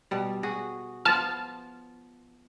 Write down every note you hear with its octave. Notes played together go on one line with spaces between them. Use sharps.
B2 G3
F#4 G#4
F3 B3 F4 A5 F6